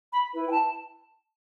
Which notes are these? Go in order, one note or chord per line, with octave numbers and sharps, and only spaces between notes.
B5
E4 B4
G5
A5